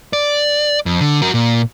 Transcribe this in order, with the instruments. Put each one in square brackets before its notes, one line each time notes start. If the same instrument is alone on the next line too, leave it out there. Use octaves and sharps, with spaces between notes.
[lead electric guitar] D5
F2
D3
F#4 A#4
A#2